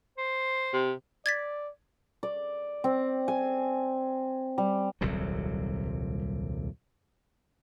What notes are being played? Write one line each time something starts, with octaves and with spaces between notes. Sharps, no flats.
C5
C3
D5 G#6 A6 B6
D5
C4
G#5
G3
D#1 C2 C3 F#3